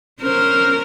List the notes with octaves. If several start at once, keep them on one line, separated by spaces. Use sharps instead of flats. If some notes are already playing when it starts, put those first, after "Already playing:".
C#4 A#4 C5